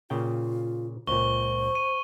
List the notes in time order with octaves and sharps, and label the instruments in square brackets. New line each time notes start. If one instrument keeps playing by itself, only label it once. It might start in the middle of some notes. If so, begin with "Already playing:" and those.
[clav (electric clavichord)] A#2 C#3 G5 [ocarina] F4
[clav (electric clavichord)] C#2 A#2 [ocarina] C5 [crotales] C#6 G7
[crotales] D#7